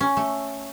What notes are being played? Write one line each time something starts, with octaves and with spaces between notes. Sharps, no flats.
C#4
A3